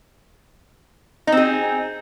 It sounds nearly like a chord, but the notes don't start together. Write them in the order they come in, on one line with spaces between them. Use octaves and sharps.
D#4 C4 G#4